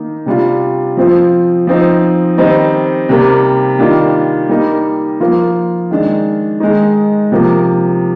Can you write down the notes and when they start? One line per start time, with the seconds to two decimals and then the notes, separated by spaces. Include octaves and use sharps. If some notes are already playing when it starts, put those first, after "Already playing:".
Already playing: D#3 A#3 D#4
0.26 C3 G3 D4 F4
0.97 F3 C4 F4
1.67 F3 C4 D#4
2.38 D#3 G3 C4 D#4
3.09 C3 G3 A#3
3.79 D#3 G3 A#3 D4 F4
4.49 G3 A#3 D#4
5.20 F3 A#3 F4
5.91 D#3 G#3 D4
6.60 D#3 G#3 D#4
7.32 C3 F3 A#3